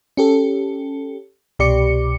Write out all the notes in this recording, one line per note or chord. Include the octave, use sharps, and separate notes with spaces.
C#4 G4 A4
C2 B2 G4 D5 D6 C#7